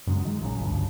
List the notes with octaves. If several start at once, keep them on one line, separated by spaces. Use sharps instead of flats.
F#2 C#3 F#3 G#3
D#3 G#3
A#1 A#2 F#3 C#4
G#1 C#2 G2 D3